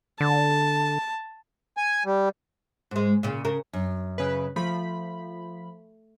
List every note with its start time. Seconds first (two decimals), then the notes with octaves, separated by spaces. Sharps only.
0.20 D3 A5
1.77 G#5
2.06 G3
2.91 G#2 G#3
3.23 A#2 C#3
3.45 C#3 A#4
3.73 F#2
4.18 C#3 B4
4.56 F3 A3 B5